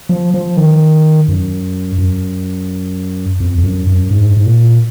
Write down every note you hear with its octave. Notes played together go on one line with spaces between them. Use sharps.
F3
F3
D#3
F#2
F#2
F2
F2
F#2
F#2
G#2
G#2
A#2